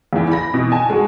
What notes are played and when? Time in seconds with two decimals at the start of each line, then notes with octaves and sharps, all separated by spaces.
0.13 E2 E3
0.32 B5 A#6
0.54 B2 E3
0.72 G#5 A5
0.90 G#3 F#4